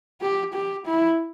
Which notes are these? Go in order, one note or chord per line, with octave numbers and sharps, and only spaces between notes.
G4
G4
E4